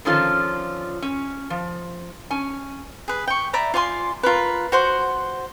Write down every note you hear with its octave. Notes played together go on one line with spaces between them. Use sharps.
D3 D#3 F3 C#4 F4 A4
C#4
F3
C#4 G#5
G#4 B4
G5 C#6
D5 E5 A#5 B5
F4 D5 G#5 C6
F4 A#4 B4
F#4 C5 F#5